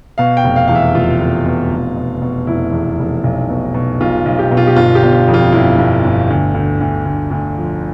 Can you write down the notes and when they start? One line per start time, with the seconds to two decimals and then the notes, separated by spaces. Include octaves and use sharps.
0.18 B2 F5
0.37 G5
0.44 F1
0.56 F5
0.67 E2 F5
0.75 E5
0.94 F1 F4
1.21 F1
1.46 B2
1.71 F1
1.96 B2
2.22 B2
2.47 F1 E4
2.72 E2
2.99 F1
3.24 B1
3.50 B2
3.74 B2
4.00 B1 F4
4.25 B1
4.39 G4
4.51 B2
4.57 F4
4.67 G4
4.76 G1 F4
4.95 G4
5.03 G1
5.28 F2
5.34 F4
5.53 G1 E4
5.78 G1
6.05 G1
6.30 D2
6.54 D2
6.81 D2
7.05 D2
7.31 D2
7.57 F3